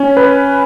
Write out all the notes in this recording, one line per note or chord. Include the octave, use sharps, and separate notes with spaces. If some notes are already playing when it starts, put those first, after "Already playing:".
Already playing: C#4
B4